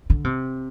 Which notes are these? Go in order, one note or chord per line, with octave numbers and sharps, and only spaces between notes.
D3
C3